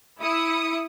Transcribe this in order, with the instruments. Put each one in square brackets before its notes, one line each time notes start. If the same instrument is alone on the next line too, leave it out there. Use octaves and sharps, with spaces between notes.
[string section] E4 D#6 C#7